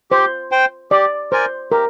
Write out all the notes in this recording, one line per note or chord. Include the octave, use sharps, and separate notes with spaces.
G4 C5
C5 G5
G4 D5
A#4 C5 D5 G#5
G4 A#4